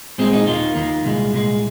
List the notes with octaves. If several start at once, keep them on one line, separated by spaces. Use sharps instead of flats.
A#2 G#3 C4
D#4
D#2 D#3 A#3 F4
D#2 D#3 A#3
C2 A#2 G#3
C2 A#2 G#3